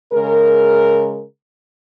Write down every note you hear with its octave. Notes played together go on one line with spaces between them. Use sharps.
C#3 G#3 G#4 A#4